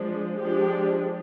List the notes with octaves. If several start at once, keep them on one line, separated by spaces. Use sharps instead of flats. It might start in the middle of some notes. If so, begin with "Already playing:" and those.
Already playing: F3 G#3 D4
F3 G#3 D4 G4